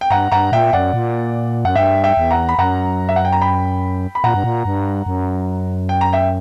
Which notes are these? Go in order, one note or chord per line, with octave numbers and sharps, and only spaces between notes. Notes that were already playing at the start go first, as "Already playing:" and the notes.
G5
G2 F#5 A#5
G2 F#5 A#5
A#2 E5 G5
F#2 D5 F#5
A#2
F#2 F#5
G2 E5 G5
E5 G5
E2
F#5 A#5
B5
F#2 F#5 A#5
E5
F#5
G5
A#5
G5 B5
B5
A#2 F#5 A#5
G2
A#2
G2
F#2
G5
A#5
E5 G5